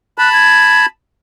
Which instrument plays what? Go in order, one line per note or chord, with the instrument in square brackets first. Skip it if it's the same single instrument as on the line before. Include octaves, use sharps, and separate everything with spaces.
[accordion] A5 B5 [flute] F#6
[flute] G#6